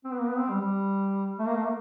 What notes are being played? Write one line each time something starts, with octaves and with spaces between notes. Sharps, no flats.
C4
B3
A#3
B3
C4
G3
G3
A3
A#3
A3
A#3